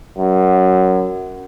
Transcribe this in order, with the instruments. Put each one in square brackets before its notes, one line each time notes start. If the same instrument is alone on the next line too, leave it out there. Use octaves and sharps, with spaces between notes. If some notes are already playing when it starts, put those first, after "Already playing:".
[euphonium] F#2